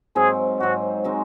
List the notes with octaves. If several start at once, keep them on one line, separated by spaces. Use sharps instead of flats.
G#2 F#3 C4 G#4
G#2 F#3 C4 F#4
G#3 C4 D#4 F#4